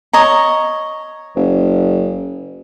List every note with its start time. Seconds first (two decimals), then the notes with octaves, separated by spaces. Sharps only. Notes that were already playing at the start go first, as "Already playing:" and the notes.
0.13 C#5 D#5 A#5
1.36 F#1